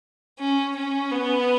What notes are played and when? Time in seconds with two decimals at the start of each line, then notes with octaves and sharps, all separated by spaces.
0.40 C#4
0.76 C#4
1.12 B3